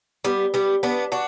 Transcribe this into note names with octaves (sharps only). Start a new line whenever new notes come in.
G3 B3
G3 B3
B3 D4
D4 F#4